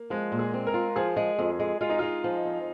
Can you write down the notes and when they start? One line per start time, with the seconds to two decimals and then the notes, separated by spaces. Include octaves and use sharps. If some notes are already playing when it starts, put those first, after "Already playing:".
Already playing: A#3
0.10 F3 G#3
0.32 A#2
0.39 G#4
0.54 C4
0.67 A#4
0.74 F4
0.96 F3 G#4
1.17 G#3
1.39 F2
1.59 G#3
1.81 G#3 F4
1.89 D#4
1.99 G#3 F4
2.24 F3
2.45 F2